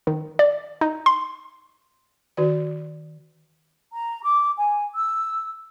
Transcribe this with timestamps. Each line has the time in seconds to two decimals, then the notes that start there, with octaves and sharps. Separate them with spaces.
0.07 D#3
0.39 D5
0.81 D#4
1.06 C6
2.37 D#3 F#4 D5
3.93 A#5
4.23 D6
4.57 G#5
4.95 E6